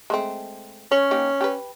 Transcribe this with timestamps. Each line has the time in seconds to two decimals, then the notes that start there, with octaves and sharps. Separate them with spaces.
0.10 G#3 A3 C4
0.91 C#4 C#5
1.11 A#3 D#4 G4
1.41 G4 G#4 B4